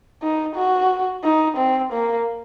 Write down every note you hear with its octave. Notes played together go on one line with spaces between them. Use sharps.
D#4
F#4
D#4
C4
A#3